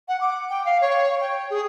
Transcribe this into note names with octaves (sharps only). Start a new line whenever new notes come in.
F#5
D6
G5
F5
C#5
G5
G#4